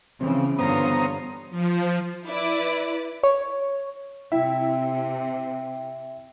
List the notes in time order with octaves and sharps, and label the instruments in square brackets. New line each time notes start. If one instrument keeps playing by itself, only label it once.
[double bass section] C#3 [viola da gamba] E3 F3 [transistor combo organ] C4
[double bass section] G2 [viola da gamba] D3 F4 C#5 [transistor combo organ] B3 C5 D#6 [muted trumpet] A#5
[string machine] F3
[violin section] E4 B4 D5
[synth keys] C#5
[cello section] C3 C4 [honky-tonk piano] E4 [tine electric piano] E5 [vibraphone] G5